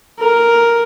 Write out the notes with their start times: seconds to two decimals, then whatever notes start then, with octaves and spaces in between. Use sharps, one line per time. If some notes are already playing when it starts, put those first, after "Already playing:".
0.20 A#4